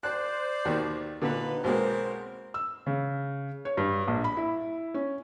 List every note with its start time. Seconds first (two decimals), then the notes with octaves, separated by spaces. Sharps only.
0.03 C5 D5 F#6
0.65 D#2 B2 D#3
1.22 D#2 A#2 D3 D#4 B4
1.64 B1 G#3 A#3 C4 A#4 C5
2.54 E6
2.86 C#3
3.65 C#5
3.77 G2
4.08 A#1
4.24 B5
4.37 E4
4.94 C#4